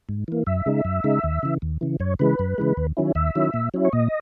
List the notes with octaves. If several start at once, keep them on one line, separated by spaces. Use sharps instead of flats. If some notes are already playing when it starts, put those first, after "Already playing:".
G#2
E3 A#3
F#2 E5
C#3 G#3 D#4
F#2
C#3 G#3 D#4
D#2
C#3 E3
D#2
C#3 E3
F#2 C#5
C#3 E3 G#3 B4
F#2
C#3 E3 G#3
D#2
D#3 F#3 C#4 E4
D#2 E5
D#3 F#3 C#4 E4
A#2
F#3 C#4 E4
C#5
A#2 D#5